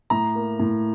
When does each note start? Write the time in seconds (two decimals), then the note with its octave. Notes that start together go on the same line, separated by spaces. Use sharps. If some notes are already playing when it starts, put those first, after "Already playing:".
0.10 A2 A#5
0.35 A#3
0.60 A2